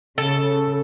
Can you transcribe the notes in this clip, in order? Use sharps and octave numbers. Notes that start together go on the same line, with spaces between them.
C#3 A4